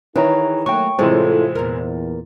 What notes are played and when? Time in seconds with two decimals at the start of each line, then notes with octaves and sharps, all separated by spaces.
0.16 D#3 E3 E4 G#4 B4 C#5 A#5
0.66 F#3 A3 A#3 G5 C#6
0.99 A2 C3 E3 G#3 A3 C#4 F4 C5
1.55 E2 A#2 A#4